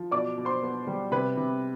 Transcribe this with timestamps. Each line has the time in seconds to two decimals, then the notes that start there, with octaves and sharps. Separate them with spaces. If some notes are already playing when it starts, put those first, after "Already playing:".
Already playing: F3
0.11 B2 D5 D6
0.38 B2
0.45 C5 C6
0.62 B3
0.87 G3
1.12 C3 B4 B5
1.37 C3